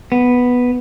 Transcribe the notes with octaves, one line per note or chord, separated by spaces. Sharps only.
B3